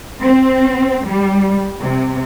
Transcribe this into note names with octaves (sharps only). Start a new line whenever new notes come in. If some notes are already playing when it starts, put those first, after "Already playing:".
C4
G3
C3